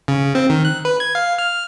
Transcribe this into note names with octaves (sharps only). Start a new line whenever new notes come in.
C#3
C4
D#3
F#6
B4
G#6
F5
F6